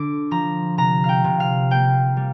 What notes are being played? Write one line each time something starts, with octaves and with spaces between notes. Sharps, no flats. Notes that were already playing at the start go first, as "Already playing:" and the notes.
Already playing: D3 D6
F3 A#5
C3 A#5
F5 G5
C3
F5
A#3 G5
G3